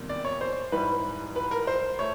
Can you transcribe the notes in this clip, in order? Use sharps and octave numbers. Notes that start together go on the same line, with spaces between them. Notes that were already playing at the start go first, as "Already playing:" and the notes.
Already playing: E2 C3 D#3 G3 A#3
D5
C#5
C5
G#2 E3 G3 B4
B4
A#4
C5
A3 C#5